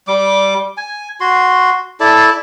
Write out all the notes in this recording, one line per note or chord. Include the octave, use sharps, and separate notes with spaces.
G3 D6
G#5
F#4 C6
E4 A4 D5 A5